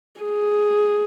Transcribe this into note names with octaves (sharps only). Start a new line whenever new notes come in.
G#4